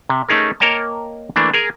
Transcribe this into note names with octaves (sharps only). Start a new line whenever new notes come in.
C3
A3 C#4 D#4 G#4 A#4
A#3 A#4 C#5 D#5 G5 A5
E3 A3 A#3 D4
G#4 A#4 G#5